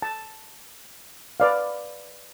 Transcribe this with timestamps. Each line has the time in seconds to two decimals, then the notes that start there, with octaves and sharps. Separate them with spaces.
0.02 A5
1.40 B4 D5 F5